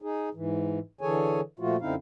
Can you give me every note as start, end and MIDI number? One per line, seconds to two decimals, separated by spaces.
0.02 0.29 63
0.02 0.29 68
0.34 0.79 44
0.34 0.79 52
1.01 1.41 50
1.01 1.41 52
1.01 1.41 68
1.01 1.41 69
1.01 1.41 73
1.01 1.41 80
1.59 1.76 46
1.59 1.76 53
1.59 1.76 57
1.59 1.76 65
1.59 1.76 66
1.81 1.95 42
1.81 1.95 50
1.81 1.95 60
1.81 1.95 63
1.81 1.95 64
1.81 1.95 77